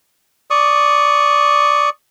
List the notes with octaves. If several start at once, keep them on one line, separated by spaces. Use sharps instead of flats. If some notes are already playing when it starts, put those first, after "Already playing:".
D5 C#6 D#6